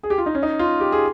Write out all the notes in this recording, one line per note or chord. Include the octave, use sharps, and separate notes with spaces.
G#4
G4
F4
D#4
C#4
D#4
F4
G4
G#4